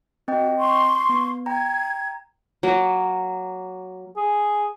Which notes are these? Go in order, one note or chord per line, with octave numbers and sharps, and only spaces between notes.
C4 F#4 D#5 G5
C6 C#6
B3
G5 A#5 G#6
F#3 A#3
G#4